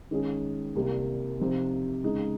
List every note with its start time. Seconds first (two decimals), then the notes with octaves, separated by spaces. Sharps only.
0.11 D#3 G#3 C#4 G#4
0.75 C2 C3 G3 A#3
1.40 C3 F3 C4 D#4
2.03 C#3 G#3 D#4